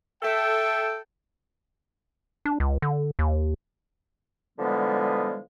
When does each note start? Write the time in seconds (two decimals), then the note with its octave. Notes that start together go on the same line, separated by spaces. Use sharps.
0.23 A4 E5 G5
2.45 D4
2.60 C#2
2.82 D3
3.19 D#2
4.58 D3 E3 F3 G3 G#3 B3